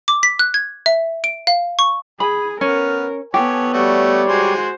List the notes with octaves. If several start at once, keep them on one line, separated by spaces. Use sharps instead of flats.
D6
B6
F#6
G#6
E5
D7
F5
C#6
G#4 G#5 B5
B3 C#4 A#4 F6
B3 G4 A4 C#5 G#5
G3 A3 F#4 C#5 D5
G#3 F#4 C5 G#5 C6